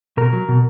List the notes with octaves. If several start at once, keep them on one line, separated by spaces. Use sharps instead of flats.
B2 A#4
F#3
B2